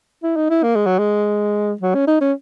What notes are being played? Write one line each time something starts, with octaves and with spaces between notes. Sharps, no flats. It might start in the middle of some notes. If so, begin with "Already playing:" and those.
E4
D#4
E4
A#3
G#3
F#3
G#3
F#3
C#4
D#4
C#4